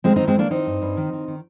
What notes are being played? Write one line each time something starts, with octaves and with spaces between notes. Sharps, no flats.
D#3 G#3 C4
D#3 C4 D#4
G#3 C4
D#3 A#3 D4
D#3 C4 D#4
G2
G2
D#3
D#3
D#3